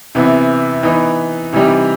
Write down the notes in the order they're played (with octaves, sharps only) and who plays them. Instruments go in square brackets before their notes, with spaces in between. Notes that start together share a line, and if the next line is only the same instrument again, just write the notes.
[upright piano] C3 E3 B3 E4
E3 B3 D#4
C3 E3 G3 D#4 G4